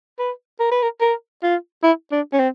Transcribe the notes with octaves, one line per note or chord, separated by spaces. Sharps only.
B4
A#4
B4
A#4
A#4
F4
E4
D4
C#4
C4